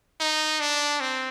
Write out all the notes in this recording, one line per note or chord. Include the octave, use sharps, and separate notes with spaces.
D#4
D4
C4